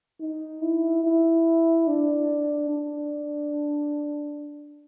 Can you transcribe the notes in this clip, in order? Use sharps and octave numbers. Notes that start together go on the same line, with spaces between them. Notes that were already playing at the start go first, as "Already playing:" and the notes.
D#4
E4
E4
D4
D4